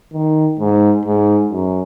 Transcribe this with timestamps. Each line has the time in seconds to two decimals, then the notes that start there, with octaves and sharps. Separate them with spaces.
0.13 D#3
0.59 G#2
1.05 G#2
1.51 F#2